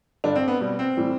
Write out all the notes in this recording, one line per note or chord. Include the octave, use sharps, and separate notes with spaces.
G2 D3 G3 D4
C4
B3
B2 G3
C4
A2 E3 G3